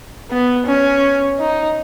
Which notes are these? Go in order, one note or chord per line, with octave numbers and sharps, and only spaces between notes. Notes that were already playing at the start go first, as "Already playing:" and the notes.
B3
C#4
D#4